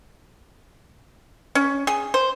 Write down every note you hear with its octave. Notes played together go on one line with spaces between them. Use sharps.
C#4
G#4
C5